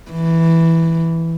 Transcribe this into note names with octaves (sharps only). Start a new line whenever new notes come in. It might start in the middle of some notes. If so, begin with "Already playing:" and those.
E3